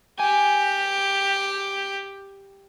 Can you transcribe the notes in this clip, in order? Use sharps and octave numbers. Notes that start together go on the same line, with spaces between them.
G4 G#5